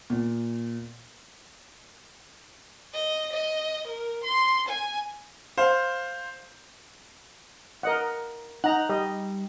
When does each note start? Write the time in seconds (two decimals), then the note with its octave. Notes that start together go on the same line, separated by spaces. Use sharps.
0.10 A#2
2.93 D#5
3.33 D#5
3.87 A#4
4.24 C6
4.68 G#5
5.58 C5 F5
7.83 A#4 D#5 F#5
8.64 D#4 F#5 A#5
8.89 G3 D#5